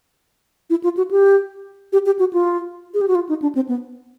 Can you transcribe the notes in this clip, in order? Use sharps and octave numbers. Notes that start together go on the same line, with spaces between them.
E4
F4
F#4
G4
G4
G4
F#4
F4
G#4
G4
F#4
F4
D#4
D4
C4
B3